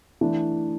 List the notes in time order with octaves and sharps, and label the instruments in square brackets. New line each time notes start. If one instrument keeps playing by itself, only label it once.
[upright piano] E3 A3 D4